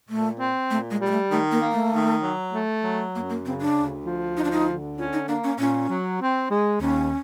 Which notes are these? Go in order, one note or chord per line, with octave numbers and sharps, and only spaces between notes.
A#2 A3
C4
A#2 A3
G#3
G3 G#3
A3
D#3 A3
A#3
A#3
A3
D#3
F#3
A3
F#3
F#2 A#3
A#3
C#3 C4
D4
D2
F3
D2 D#4
D4
D#4
D3
C#4 F4
D#4
A#3 D4
C#4
A#2 C#4
F#3
C4
G#3
D#2 C#4